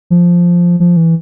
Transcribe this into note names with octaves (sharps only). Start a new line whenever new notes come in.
F3
F3
E3